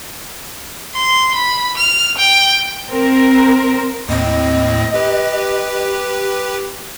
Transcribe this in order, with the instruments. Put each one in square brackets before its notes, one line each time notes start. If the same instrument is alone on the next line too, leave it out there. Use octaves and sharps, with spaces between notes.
[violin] C6
B5
F6
G5
[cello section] C4 A#4
[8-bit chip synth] D#2 A2 C4 [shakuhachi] D#5
[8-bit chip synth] G4 B4